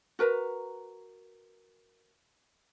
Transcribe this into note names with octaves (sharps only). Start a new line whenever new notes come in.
F#4 A#4 B4 A#5